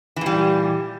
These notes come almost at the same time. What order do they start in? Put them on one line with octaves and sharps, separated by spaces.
E3 A#2 G3